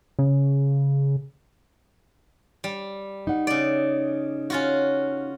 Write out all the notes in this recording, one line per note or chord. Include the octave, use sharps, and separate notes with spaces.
C#3
G3
D#4 F#5
C#3 D5
C#4 F4 F#4